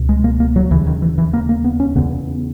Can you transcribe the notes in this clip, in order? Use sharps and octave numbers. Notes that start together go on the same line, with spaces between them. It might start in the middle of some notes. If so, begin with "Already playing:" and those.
Already playing: C#2 B2
G#3
A#3
A#3
F#3
D#2 C#3 E3
D#3
E3
E3
A#3
A#3
B3
C#4
E2 C#3 B3